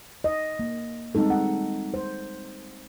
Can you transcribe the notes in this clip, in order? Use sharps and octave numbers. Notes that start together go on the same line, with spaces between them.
D#5
A#3
G3 G#3 C4 D#4 A4
F#5
C5